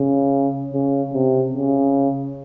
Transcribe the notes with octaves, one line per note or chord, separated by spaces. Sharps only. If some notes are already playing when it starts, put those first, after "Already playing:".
Already playing: C#3
C#3
C3
C#3